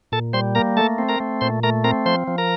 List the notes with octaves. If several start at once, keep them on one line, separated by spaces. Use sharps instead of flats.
A#2 A4 A5
G3 C5 C6
A#3 A#4 A#5
A3 A4 A5
C4
A#4 A#5
A3
A#2 C5 C6
A3 A#4 A#5
C4 A#4 A#5
F3 C5 C6
F3
A#4 A#5